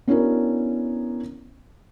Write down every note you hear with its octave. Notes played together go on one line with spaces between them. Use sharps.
B3 C#4 D4 E4 F#4 A#4